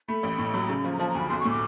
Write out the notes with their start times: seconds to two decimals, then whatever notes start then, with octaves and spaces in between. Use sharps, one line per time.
0.08 A3 B5
0.23 A1
0.38 A2
0.54 F#3
0.69 C#3
0.84 F3
0.92 A#5
0.99 F3 A5
1.09 A#5
1.15 D2 B5
1.29 B1 C6
1.40 C#6
1.45 A2
1.50 D6